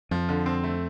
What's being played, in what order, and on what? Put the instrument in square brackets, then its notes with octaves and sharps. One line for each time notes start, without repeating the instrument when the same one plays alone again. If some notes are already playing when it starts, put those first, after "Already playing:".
[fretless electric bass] F2 [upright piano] F3
[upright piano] D3
C4
A3